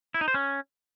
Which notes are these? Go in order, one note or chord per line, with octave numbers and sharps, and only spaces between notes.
E4
D#4
C5
C#4